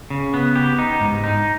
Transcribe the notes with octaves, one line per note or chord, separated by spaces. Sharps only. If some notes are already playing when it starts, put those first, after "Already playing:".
C#3
B3
G4
D#4
G#2
D#4